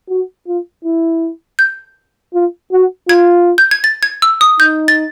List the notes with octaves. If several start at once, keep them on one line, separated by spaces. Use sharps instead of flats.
F#4
F4
E4
G6
F4
F#4
F4 G#6
G6
G#6
A6
G#6
E6
D#6
D#4 G6
A6